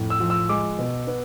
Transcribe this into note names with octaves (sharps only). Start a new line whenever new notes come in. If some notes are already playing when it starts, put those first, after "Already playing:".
Already playing: F2 A2
E6
F3
E6
G#3 D6
B2
B3